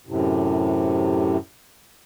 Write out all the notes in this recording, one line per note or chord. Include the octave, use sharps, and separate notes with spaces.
F#2 A2 C3